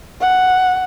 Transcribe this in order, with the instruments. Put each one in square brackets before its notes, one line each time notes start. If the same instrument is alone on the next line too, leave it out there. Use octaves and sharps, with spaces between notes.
[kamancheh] F#5